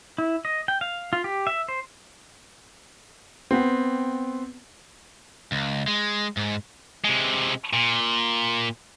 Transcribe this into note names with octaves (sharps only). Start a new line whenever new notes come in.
E4
D#5
G5
F5
F4
G4
E5
C5
B3 C4
C#2
G#3
G#2
C3 G#3
A#2